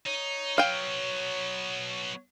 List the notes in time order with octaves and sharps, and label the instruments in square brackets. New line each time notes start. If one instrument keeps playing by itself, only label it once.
[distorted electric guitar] D#4 [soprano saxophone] C#5
[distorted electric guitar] F#3 B3 [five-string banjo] F5 G5